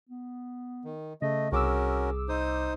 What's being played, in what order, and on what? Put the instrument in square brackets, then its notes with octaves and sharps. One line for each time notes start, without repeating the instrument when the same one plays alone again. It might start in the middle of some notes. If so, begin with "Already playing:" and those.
[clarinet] B3
[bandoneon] D#3
[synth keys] C#3 [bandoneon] A3 [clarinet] D#5
[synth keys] C2 D6 E6 [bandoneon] C#4 F#4 A#4 [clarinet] G#4
[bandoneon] D#4 C5 D#6